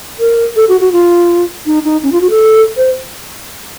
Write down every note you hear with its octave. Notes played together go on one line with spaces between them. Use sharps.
A#4
A4
F#4
F#4
F4
D#4
D#4
C#4
F4
F#4
A4
C5